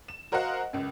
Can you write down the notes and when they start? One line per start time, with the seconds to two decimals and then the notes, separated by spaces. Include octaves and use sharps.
0.08 E7
0.32 F#4 A#4 C5 D#5 F5 F#5
0.73 C#2 F#2